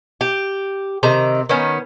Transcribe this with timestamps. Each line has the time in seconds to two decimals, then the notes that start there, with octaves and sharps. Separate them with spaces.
0.21 G4
1.03 C3 D#3 A#5
1.49 D#3 B3 C#4